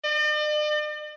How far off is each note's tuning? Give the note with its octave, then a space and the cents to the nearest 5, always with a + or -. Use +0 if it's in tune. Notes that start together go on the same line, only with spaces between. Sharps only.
D5 +45